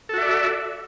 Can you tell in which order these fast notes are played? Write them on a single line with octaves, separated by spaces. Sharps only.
A4 F#4 E5 D5